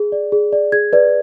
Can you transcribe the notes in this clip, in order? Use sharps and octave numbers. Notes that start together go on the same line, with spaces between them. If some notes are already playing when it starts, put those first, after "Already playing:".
Already playing: G#4
D5
G#4
D5
G#4 G#6
B4 D5